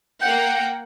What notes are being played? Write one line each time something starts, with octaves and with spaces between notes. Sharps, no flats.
A#3 F#5 G5